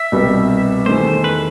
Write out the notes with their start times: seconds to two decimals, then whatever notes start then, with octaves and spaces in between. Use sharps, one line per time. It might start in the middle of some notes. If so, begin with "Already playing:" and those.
Already playing: E5
0.12 C2 B2 G3 B3
0.86 E2 D#3 A3 C5
1.24 B4